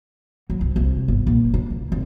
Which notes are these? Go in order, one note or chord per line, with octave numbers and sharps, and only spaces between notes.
F#3
C2
C2
G1
A#1
D4
C#2
F1